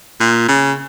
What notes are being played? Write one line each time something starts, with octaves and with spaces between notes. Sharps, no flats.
A#2
C#3